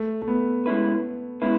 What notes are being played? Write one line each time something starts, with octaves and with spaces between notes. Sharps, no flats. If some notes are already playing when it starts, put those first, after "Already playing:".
Already playing: A3
A3
B3
G#3 C#4 E4 B4
G#3 B3 C#4 E4 B4